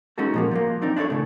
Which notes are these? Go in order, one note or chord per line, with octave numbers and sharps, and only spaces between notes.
G#3 C#4 D#4 F#4 A4
A#2 F3 A#3
F3 F#3 A#3
C4 D4 D#4
D4 E4 G4 A4 C#5
A2 C#3